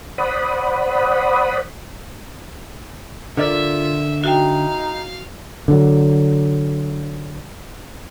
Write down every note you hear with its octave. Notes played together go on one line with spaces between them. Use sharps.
C5 D5 F#5 B5 D#6
D3 F4 A#4 D5 E5
D#4 F#4 E5 F5 G5
D3 F#3